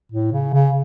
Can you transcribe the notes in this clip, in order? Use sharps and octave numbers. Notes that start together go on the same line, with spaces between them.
A2
C#3
C#3